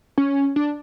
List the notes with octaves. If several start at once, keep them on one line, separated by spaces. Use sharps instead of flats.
C#4
D4